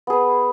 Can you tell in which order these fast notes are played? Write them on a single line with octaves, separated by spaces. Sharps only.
B3 G#4 B4